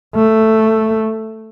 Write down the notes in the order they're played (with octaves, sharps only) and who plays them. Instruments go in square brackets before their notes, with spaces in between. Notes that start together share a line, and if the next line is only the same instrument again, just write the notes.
[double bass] A3